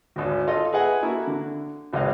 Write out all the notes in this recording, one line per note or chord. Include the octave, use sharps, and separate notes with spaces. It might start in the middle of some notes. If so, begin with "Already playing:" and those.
G#1 D2
F4 A4 D#5
G#4 B4 D#5 E5 F#5 G#5
A#3 E4 F#4 A4
D3
G#1 C#2 G#2 D#5 F5